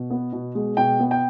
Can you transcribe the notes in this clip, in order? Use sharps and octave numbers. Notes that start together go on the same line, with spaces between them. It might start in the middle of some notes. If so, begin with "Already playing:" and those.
Already playing: B2
B3
B2
G#3
B2 G5
B3
G5